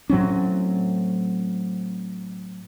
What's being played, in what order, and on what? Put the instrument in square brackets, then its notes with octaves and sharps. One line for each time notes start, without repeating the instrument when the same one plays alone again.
[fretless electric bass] A2 F#3 C4 C#4